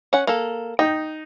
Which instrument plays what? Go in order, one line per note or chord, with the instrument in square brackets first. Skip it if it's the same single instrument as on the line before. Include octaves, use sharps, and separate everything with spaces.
[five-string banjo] C#4 F#5
A#3 A4
[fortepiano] D#4 [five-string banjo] G5